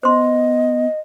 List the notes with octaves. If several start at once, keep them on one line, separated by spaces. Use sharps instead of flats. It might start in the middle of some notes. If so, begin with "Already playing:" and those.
B3 C5 D#5 C6